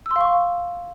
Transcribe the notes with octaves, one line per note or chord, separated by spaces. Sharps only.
F5 C6 C#6 E6